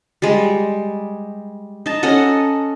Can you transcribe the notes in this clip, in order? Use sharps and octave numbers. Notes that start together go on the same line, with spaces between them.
G3 G#3
D#4 A5
C#4 A4 D#5 F#5